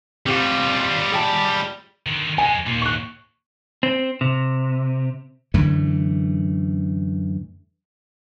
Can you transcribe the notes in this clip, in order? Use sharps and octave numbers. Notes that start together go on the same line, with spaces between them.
G3 C4 F4 G4 F#5
G#4 G5 A5
D3 D#3
F2 G#3 G#5
D#2 A#2
C#6 F#6
C4
C3
F#2 D3 E3 A3